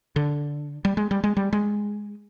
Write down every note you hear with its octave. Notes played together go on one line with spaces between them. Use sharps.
D3
G3
G#3
G3
G#3
G3
G#3